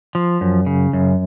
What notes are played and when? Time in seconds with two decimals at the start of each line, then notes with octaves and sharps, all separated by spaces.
0.15 F3
0.41 F#2
0.66 C#3
0.93 F#2